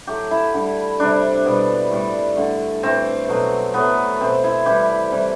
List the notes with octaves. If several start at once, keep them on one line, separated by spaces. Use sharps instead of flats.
A2 F#3 A3 G4
E4
D3 G3
C3 G3 D4
B2 G3
A2 G3
D3 A3
A2 E3 A3 C4
B2 F#3 A3
A2 F#3 A3 B3
B2 A3 C4
E4
C3 E3 G3 G4
C3 E3 G3